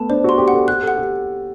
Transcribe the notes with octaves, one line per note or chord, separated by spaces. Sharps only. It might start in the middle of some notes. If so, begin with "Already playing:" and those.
Already playing: A3 B3 A5
D4 C5
F#4 C6
G4
F#5
A4
G4 F#6
A4
F#5
G4